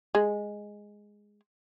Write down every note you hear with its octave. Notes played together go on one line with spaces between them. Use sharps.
G#3